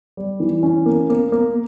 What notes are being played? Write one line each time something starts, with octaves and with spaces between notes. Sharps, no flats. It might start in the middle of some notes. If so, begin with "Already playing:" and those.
G3
E3
C#4
A#3
A#3
A#3